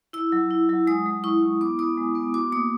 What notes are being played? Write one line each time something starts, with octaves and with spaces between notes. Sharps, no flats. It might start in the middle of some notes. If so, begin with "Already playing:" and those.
E4 E6
F#3
E4
F#3
G#3 D#6
G#3
E4 C#6
E4
B3 D6
B3 D#6
G#3
B3
F#4 D6
A#3 D#6